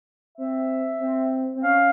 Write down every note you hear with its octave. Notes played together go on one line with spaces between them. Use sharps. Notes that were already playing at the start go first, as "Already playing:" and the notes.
C4 E5
C4
C4
C#4 F5